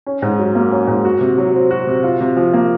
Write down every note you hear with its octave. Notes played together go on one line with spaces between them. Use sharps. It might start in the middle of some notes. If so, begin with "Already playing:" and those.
C#4
G#2
F#3
A#3
C#4
G#2
F#4
C3
F#3
C4
F#4
C3
F4
C3
F3
A#3